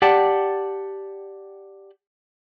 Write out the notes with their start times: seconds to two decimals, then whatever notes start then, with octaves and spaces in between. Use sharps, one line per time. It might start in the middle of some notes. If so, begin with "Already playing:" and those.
0.02 G4 D5 F#5 G5 A5